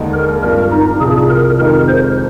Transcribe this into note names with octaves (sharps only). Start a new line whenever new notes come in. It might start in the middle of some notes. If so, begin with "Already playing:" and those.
Already playing: D#2 D3 G#3 D#4
A#4
G2 F3 C4 A#4
D#4
C2 C3 F3 C4 G#4
A#4
F2 C3 D#3 G#3 D#4 A#4
C5